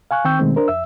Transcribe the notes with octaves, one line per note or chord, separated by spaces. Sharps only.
F5 G#5 C#6 F#6
D#3 C4 G5 C#6 E6 G6
B2 D#3 G#3 A3 C4
D4 A#4 C5
F2 E5 E6